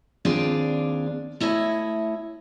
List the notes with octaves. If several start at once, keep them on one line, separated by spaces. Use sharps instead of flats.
D#2 C4 D4 F4 G#4 D5
A3 E4 C#5 D#5